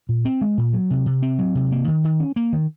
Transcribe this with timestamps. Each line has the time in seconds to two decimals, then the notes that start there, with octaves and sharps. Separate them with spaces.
0.09 A#2
0.25 C4
0.41 G#3
0.58 A#2
0.73 F#3
0.90 C3
1.06 C3
1.22 C4
1.39 F#3
1.55 C3
1.71 A#3
1.88 D#3
2.04 D#3
2.20 C#4
2.36 A#3
2.53 D#3